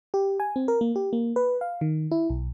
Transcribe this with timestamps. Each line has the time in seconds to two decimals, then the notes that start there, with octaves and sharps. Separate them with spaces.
0.14 G4
0.40 G#5
0.56 C4
0.68 A#4
0.81 A#3
0.96 G4
1.13 A#3
1.36 B4
1.61 F5
1.81 D#3
2.11 E4
2.30 B1